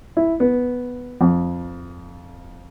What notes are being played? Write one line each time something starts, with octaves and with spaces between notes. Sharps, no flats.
E4
B3
F2